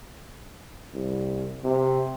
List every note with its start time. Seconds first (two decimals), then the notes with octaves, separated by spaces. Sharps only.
0.94 C2
1.64 C3